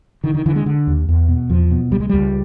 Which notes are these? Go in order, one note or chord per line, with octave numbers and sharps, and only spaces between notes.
D3 D#3
D#3
D3 E3
G#3
D3
D#2
E2
B2
E2 F3
B2
C#2 G3
G#3
C#2 G3